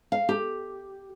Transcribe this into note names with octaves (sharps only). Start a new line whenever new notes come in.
F5
G4